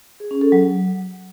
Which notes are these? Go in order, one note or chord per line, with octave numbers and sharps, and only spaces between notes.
G#4
C#4
A4
F#3